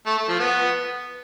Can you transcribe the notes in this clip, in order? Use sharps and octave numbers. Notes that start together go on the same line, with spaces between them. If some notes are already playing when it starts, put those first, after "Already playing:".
A3
A3
F3
B3